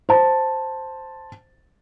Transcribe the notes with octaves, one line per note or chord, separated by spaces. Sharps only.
C5 A5